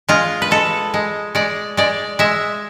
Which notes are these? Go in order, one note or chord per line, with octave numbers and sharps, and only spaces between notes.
G#3 F4
B4
G#3 A4
G#3
G#3 D5
G#3 D5
G#3 E5